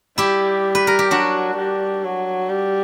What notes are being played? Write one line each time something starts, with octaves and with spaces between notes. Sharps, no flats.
G3 E4 G4
B4
A#4
G4
F#3 D4 F#4
G3
F#3
G3